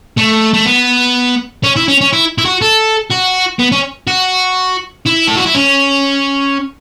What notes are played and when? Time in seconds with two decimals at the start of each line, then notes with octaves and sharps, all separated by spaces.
0.17 A3
0.54 A3
0.66 B3
1.64 C#4
1.76 E4
1.88 C#4
2.01 C#4
2.13 E4
2.38 E4
2.45 F#4
2.62 A4
3.10 F#4
3.59 B3
3.72 C#4
4.08 F#4
5.06 E4
5.27 A4
5.37 F#4
5.46 E4
5.54 C#4